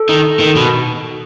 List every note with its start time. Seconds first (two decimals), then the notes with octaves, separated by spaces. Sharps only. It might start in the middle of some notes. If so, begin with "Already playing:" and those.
Already playing: A4
0.09 D#3
0.40 D#3
0.56 B2